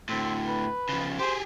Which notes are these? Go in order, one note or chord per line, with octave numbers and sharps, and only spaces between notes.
A2 D3 C4
B4
C#3 F3
G4 G#4 C5